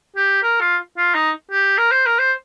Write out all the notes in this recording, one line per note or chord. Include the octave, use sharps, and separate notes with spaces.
G4
A#4
F4
F4
D#4
G4
A#4
C5
A#4
C5